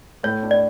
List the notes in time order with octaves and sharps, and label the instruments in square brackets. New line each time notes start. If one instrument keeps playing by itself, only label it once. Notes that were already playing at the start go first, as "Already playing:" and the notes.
[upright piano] A2 [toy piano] C#5
[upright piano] D4
[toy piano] D5